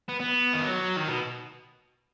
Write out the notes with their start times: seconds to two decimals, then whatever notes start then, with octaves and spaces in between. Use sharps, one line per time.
0.08 B3
0.20 B3
0.53 D#3
0.64 F#3
0.96 D#3
1.08 B2